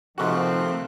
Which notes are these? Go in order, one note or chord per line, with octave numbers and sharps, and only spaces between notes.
G#2 C3 D#3 F3 A3 C4 F#4 F#6